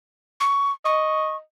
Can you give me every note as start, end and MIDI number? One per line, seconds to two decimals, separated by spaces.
0.40 0.72 85
0.85 1.38 75
0.85 1.36 85